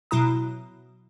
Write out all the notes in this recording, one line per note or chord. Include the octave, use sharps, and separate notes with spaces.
B2 F#3 E4 A#5 D#6